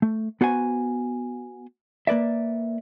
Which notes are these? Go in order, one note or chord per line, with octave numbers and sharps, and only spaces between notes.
A3
B3 F#4 C5 F#5 G#5
A#3 B4 D5 E5